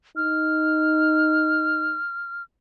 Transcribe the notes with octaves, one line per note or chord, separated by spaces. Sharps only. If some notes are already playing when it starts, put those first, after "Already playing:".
D#4 F6